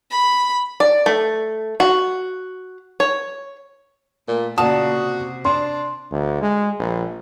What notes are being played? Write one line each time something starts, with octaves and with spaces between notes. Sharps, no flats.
B5
D5
A3
F#4
C#5
A#2 A3
A#2 C#3 F#4 D5 A5 D#6
C3
D4 C6
D2
G#3
A#1